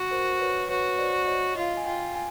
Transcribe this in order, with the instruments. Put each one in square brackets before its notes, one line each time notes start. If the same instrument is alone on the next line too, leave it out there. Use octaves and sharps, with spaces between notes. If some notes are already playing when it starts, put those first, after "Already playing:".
Already playing: [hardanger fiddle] F#4
[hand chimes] A#4 C5
B4 C#5
[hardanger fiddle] F#4 [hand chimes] B4 C#5
[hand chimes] C5 D5
C#5 D#5
[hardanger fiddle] F4 [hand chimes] D#5 F5
[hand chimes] G#5
[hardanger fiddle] F4 [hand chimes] F5 G5
[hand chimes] G#5